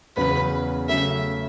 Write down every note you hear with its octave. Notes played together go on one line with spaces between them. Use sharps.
E2 C#3 F#3 B3 B4
C#3 F#3 A3 E5